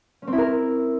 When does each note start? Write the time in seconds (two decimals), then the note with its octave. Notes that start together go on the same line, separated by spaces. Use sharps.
0.22 C#4
0.27 C4
0.33 E4
0.38 A#4